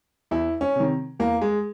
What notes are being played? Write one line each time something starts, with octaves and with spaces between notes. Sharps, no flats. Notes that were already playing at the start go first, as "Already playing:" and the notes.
E2 E4
C#4
C3 D#3
E2 A#3
G#3